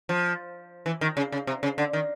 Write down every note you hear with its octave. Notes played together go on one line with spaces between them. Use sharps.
F3
E3
D#3
C#3
C#3
C3
C#3
D3
D#3